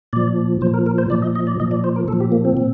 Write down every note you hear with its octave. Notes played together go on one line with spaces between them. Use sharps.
A#2 F3 D5
A#2 F3 C5
A#4
A#4
C5
A#2 F3 D5
D#5
D#5
D5
A#2 F3 D#5
D5
C5
A#4
A#2 F3 A4
G4
A#3
C4
A#2